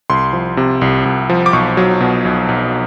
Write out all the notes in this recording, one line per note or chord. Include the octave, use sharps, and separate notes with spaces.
C2 C6
F3
C3
C2
C2
F3
D6
B1 C#6
F#3
B2
B1
B1